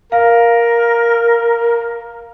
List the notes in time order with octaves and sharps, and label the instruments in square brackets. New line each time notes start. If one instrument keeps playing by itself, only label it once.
[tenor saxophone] A#4 [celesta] F5